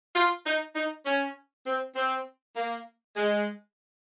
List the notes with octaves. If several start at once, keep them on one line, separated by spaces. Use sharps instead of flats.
F4
D#4
D#4
C#4
C4
C4
A#3
G#3